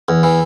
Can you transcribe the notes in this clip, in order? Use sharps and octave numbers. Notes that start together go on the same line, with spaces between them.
E2
E3